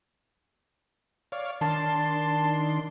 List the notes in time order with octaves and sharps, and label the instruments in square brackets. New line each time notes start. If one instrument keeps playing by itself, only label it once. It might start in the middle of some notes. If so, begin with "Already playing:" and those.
[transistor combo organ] C#5 D5 F5
[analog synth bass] D#3 [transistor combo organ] D4 C6 [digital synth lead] A5